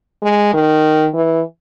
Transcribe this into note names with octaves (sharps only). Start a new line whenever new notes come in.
G#3
D#3
E3